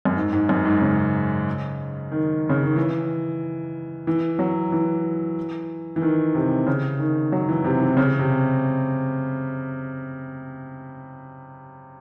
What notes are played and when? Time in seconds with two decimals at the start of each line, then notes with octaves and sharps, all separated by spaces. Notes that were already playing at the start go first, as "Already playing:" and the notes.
0.05 F#2
0.16 G#2
0.33 G#2
0.49 F#2
0.65 G#2
0.81 C#3
2.12 D#3
2.49 C#3
2.63 D#3
2.76 E3
4.07 E3
4.39 F#3
4.72 E3
5.96 E3
6.02 D#3
6.35 C3
6.67 C#3
6.99 D#3
7.32 F#3
7.49 E3
7.64 C3
7.81 E3
7.97 C#3
8.19 C3